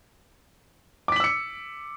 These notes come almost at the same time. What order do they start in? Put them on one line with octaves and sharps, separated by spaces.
D6 B6 F#7 E6 C#7